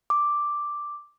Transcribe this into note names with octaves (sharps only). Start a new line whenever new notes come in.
D6